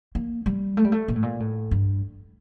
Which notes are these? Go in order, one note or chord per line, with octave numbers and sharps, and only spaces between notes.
A#3
G3
A3
G3
A3
A#2
A2
A#2
A2
G2